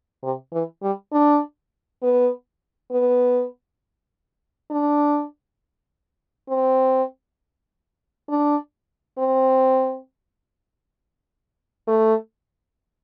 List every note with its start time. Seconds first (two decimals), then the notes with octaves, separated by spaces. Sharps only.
0.24 C3
0.53 E3
0.83 G3
1.13 D4
2.03 B3
2.91 B3
4.71 D4
6.49 C4
8.29 D4
9.18 C4
11.87 A3